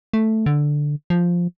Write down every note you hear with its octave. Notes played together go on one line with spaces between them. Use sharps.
A3
D3
F3